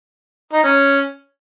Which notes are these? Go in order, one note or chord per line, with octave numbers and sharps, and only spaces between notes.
D#4
C#4